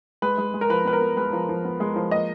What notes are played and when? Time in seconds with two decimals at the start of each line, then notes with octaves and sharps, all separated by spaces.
0.22 G#3 B4
0.38 G#3
0.54 G#3
0.61 A#4
0.70 F3 B4
0.85 B3 B4
0.93 A#4
1.01 B3
1.17 G#3 B4
1.33 F3
1.49 F3
1.65 B3
1.80 G#3
1.96 F3
2.11 A#3 D#5